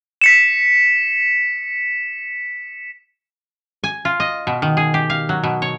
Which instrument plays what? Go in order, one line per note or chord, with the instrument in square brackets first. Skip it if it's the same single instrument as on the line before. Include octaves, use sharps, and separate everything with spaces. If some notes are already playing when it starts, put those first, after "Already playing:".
[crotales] B6 C#7 E7
[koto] G#5
F4
D#5
B2
D#3
G#4
G4
F5
F#3
B2
C#5